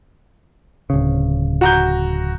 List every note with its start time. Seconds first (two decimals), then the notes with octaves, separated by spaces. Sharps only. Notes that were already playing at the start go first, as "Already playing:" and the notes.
0.90 D1 C#3
1.61 F#4 A#5 G6